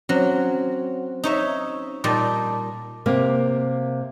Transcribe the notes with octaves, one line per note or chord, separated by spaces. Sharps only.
F#3 C4 C#4 C5
D#4 C#5 E5
A#2 G3 D#4 A5 D6
C3 A#3